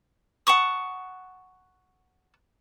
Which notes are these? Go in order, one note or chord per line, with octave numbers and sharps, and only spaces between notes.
F#5 A5 C#6 D#6